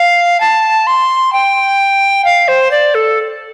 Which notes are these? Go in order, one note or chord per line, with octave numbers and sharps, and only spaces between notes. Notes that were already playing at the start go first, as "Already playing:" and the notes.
Already playing: F5
A5
C6
G5
F5
C5
D5
A4